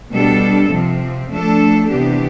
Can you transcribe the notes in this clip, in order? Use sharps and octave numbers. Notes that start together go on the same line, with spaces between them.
B2 G3 D4 A4
C3 F3 C4
F3 A3 D4 A4
C3 E3 B3 D4 G4